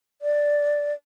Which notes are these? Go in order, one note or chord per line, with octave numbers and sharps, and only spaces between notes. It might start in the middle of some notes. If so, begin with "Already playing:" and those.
D5